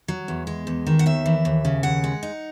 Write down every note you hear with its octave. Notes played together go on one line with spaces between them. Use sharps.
F#3
E2
G#3
E2
D#3
F#5
D#2 E5
E3
D#2
C#3
D#2 F#5
G#3
D#4